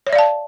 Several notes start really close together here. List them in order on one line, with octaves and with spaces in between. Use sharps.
C#5 E5 D5 F5 A5